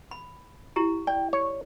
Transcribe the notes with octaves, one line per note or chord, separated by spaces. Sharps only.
B5
E4 G4 A#5
D5 G5
C#5